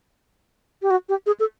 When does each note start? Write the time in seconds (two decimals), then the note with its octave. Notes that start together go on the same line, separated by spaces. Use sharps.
0.82 G4
0.90 F#4
1.09 G4
1.26 G#4
1.40 A4